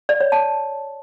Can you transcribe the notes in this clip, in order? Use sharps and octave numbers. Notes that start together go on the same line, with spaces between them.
D5
C#5
A5